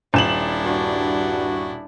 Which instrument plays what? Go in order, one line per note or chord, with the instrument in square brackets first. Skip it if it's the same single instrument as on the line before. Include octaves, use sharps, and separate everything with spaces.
[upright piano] D#1 E7 F#7 [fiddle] D4 E4
[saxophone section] G2 F#4